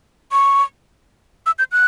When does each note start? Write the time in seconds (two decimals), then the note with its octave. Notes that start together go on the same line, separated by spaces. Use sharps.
0.32 C#6
1.46 E6
1.59 G6
1.72 F#6